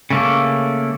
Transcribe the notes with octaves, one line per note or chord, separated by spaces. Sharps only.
C#3 A3 A#3